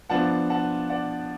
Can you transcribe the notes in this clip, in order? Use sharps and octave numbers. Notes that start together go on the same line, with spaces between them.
F3 B3 D4 F4 F#5 A5
F#5 A5
D5 F#5